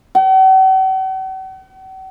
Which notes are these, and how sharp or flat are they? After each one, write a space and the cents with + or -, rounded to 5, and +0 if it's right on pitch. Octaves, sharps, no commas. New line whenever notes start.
F#5 +45